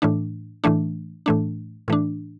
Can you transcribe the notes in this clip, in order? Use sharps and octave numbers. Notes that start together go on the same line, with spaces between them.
A2 E3 A3 D4
A2 E3 A3 D4
A2 E3 A3 D4
A2 E3 A3 D4